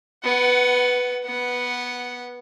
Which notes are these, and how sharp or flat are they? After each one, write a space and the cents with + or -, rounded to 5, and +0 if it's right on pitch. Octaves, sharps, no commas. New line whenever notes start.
B3 +0 F#5 +25
B3 -10 F#5 +0